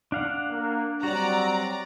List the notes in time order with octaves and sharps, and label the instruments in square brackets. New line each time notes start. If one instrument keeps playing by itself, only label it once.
[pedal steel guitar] D4 F5 F#5
[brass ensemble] A#3
[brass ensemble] F#3 G3 C4 [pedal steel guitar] F#4 [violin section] D5 A#5